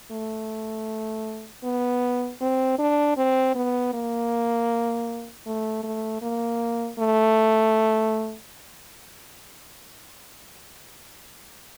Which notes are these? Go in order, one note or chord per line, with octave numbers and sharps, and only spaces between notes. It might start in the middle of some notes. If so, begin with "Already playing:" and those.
A3
B3
C4
D4
C4
B3
A#3
A3
A3
A#3
A3